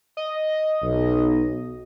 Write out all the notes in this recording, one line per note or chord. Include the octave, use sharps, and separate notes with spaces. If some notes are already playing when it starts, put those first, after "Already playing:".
D#5
B1